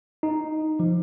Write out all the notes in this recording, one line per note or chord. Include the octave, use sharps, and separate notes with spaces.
D#4
F3